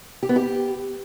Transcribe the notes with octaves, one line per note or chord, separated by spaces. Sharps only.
G4
B3
G4